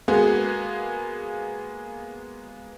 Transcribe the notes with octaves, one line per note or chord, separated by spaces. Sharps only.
G#3 A#3 B3 F#4 G#4